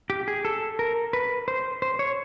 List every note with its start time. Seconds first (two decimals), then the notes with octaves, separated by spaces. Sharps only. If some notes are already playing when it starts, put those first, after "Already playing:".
0.10 G4
0.28 G#4
0.45 A4
0.79 A#4
1.13 B4
1.48 C5
1.82 C5
1.99 C#5